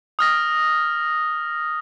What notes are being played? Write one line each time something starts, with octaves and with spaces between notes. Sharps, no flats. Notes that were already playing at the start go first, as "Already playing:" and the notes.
D#6 F6 A#6